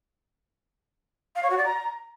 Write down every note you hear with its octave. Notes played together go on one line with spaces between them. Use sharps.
F5
C#5
F#4
D5
A#5